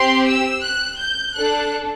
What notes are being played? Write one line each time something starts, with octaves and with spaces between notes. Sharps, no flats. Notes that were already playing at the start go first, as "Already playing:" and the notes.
Already playing: C4 G4 C6
E6
F#6
G6
D4 A4 F#6